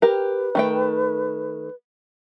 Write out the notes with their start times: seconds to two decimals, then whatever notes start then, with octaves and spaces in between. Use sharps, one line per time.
0.02 G4 A#4 B4
0.55 D#3 A3 G5